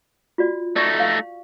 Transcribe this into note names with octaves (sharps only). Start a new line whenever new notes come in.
F4 F#4 D5
A3 D#4 D5 C#6
F5